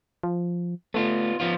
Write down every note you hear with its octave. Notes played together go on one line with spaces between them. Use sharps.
F3
A3 B3 F4
F3 B3 F4